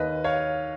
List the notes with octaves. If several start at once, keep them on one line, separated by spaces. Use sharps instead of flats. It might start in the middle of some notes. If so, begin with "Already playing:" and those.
Already playing: D#2 D#3 B4 D#5
C#5 F5